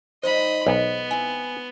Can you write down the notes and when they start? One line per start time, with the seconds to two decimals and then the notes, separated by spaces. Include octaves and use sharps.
0.23 G3 D#4 F4 C5 D#5 B5
0.66 B1 G#3 B3
1.11 C4 E4 G#5